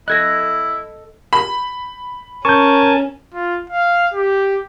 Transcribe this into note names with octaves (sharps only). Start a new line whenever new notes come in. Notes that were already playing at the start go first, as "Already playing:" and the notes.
E4 A4 D#5 F#6 G#6 A#6
B5
C#4 A#4 G#5 A5 C#6 G6
F4
F5
G4